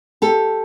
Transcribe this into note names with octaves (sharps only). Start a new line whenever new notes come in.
G4 A4